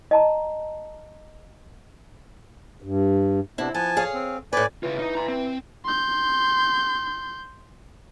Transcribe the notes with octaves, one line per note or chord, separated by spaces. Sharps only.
D#5 A5 A#5
G2
C3 B3 C4 D4 E4
F3 B3 G#5 A5
G#4 C#5 F5
C4
A2 B4 D5 G#5
C#3 E3 F4
D#4 D#5
A#5 C6
C4
C6 G6